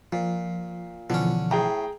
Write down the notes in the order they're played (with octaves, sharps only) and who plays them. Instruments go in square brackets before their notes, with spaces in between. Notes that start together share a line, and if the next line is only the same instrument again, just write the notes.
[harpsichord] A#2 [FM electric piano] F3
[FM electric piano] B2 E3 F3 [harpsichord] D3 C#4
[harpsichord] A2 [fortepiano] G#4 G5 A#5